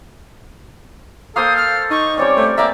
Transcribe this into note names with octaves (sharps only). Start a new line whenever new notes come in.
A#3 A4 C5 F5 G5 D#6
F6
D#4 C#6
G3 C4 C#4 C#5 D5
A3 C5
A#3 A#4 D5 E5 G#5 A#5